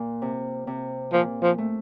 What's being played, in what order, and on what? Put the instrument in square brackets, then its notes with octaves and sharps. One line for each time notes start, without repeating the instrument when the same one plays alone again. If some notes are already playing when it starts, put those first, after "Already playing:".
Already playing: [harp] A#2
C3
C3
[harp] A#2 [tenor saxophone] F3
[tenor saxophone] F3
[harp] A3